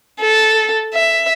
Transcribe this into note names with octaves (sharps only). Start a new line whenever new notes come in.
A4
E5